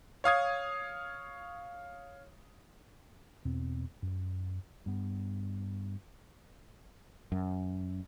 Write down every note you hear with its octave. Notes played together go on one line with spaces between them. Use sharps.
C#5 F5 D#6 G#6
E2 B2 C4
F#2
G2 B3
F#2